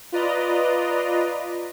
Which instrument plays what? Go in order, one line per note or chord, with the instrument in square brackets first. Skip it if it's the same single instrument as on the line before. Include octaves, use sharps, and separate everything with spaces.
[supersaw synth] F4 B4 D5 D#5 A#5